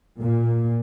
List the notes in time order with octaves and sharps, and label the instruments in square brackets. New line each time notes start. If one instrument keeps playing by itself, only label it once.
[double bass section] A#2